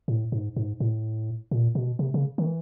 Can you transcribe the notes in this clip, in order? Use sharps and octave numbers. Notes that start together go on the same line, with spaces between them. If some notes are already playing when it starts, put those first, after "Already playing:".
A2
G#2
G#2
A2
A#2
B2
C3
C#3
D#3
E3